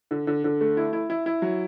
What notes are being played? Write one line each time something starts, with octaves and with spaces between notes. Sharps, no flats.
D3
D3
D3
A3
E4
E4
E4
E4
F#3